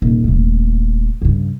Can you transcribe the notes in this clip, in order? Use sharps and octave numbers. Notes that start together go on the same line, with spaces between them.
D#1
D#1 A3
G2 C#3